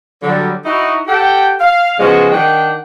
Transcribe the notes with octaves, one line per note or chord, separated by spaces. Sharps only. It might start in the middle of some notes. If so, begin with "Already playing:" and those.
D3 F#3 G3
D#4 E4 F#4
G4 A4 F#5 G5
F5
C#3 F3 G#3 B3 C#4 F#4
D#3 D4 F#5 G5